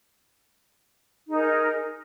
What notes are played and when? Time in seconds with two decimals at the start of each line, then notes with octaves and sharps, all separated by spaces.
1.27 D#4
1.29 G#4
1.32 A#4